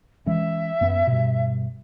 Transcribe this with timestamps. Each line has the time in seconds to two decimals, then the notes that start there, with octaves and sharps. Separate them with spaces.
0.26 E3 G#3 C#4 E5
0.81 F#2 B3
1.07 G2 B2